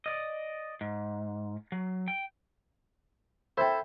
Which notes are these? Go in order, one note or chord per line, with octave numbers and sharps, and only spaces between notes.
D5 D#5
G#2
F#3
G5
E4 A4 C5 E5 G5